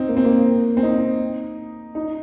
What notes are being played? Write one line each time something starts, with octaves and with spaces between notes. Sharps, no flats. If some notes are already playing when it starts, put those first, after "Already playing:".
Already playing: C4 D#4
A#3
C4
A#3
C4
D#4
D#4